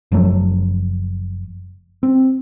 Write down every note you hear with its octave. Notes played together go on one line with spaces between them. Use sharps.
F#1 F3 F#3 A3
C4